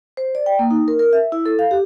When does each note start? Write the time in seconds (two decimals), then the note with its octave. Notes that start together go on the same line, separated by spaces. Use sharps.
0.17 C5
0.35 D5
0.46 G5
0.59 A#3
0.71 D#4
0.88 A#4
0.99 A#4
1.13 E5
1.32 E4
1.46 A4
1.59 F5
1.71 G4